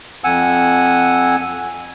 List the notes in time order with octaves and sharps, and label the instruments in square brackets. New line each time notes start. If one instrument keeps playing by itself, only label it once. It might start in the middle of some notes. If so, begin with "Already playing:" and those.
[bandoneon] F2 F#5 G#5 E6